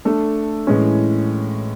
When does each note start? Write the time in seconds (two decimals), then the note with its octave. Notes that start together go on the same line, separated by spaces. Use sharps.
0.05 A3 D4 A4
0.67 A2 E3 G#3 C#4